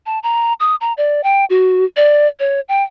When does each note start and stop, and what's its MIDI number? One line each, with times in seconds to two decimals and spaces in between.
0.06 0.19 81
0.23 0.53 82
0.60 0.75 87
0.81 0.93 82
0.97 1.21 74
1.24 1.45 79
1.50 1.85 66
1.96 2.27 74
2.40 2.60 73
2.69 2.83 79